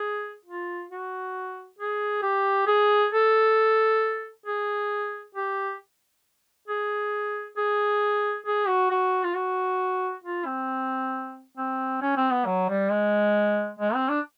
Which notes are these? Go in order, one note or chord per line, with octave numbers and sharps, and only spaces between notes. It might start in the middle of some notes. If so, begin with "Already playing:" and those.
Already playing: G#4
F4
F#4
G#4
G4
G#4
A4
G#4
G4
G#4
G#4
G#4
F#4
F#4
F4
F#4
F4
C4
C4
C#4
C4
B3
F#3
G3
G#3
G#3
C4
D4